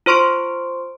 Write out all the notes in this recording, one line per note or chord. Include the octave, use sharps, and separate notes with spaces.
F4 C5 C6 C#6 D7